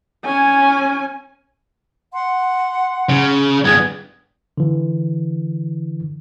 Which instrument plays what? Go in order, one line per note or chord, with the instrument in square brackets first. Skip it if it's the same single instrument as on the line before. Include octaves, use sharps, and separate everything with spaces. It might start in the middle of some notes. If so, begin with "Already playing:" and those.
[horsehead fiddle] C#4 G#5
[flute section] F#5 C6
[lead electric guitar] C#3
[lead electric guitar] G2 B3 [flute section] G#4 D#6 G#6
[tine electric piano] D3 E3